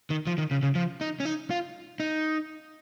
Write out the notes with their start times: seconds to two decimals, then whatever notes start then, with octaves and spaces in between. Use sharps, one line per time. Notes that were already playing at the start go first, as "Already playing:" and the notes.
0.10 D#3
0.27 F3
0.38 D#3
0.51 C#3
0.63 C#3
0.75 F3
1.01 D#4
1.20 C#4
1.25 D#4
1.51 F4
2.00 D#4